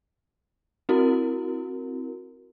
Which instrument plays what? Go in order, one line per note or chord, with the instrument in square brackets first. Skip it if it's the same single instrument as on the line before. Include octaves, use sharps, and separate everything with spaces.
[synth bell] C4 E4 F#4 A#4